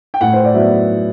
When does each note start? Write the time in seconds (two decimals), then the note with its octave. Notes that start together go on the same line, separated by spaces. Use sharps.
0.14 G5
0.21 A2 F#5
0.33 C5
0.45 D5
0.54 F#3 B3 E5